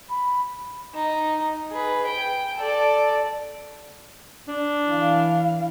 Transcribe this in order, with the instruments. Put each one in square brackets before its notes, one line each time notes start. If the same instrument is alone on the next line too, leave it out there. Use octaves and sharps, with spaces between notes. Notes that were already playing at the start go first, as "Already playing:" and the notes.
[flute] B5
[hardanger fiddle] D#4
G#4 B4
G5
A4 D5
[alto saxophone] D4
[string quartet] E3 F5